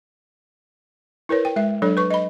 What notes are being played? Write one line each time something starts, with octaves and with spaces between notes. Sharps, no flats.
E4 A#4 B4 C#5
G5
G#3 E5
F#3 D4 A4 C#5
B4 C#6
D#5 B5